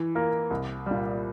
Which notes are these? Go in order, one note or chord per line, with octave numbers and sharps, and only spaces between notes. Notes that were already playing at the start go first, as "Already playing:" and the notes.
Already playing: E3
A#3 F4 A#4
C2
A#2 G3